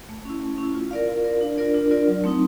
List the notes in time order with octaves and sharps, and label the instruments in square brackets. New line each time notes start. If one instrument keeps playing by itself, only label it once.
[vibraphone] A3
C#4 E4
A3
C#4 E4
F4
A#4 D5 F5
F4
A#4 D5 F5
D4
F4 A#4 D5
D4
F4 A#4 D5
F#3
A3 C4 D#4